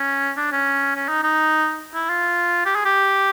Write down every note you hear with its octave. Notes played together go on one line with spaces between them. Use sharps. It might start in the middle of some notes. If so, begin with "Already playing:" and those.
Already playing: C#4
D4
C#4
C#4
D#4
D#4
E4
F4
G4
G#4
G4